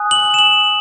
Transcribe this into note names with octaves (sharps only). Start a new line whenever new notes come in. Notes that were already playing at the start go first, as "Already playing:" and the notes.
Already playing: G#5 D#6 F#6
F#7
E7
F#7